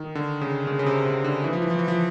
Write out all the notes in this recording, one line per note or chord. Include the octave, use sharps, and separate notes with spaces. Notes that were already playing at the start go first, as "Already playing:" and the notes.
Already playing: D#3
D3
C#3
C#3
C#3
C3
C3
D3
E3
F3
E3
F3
E3
F3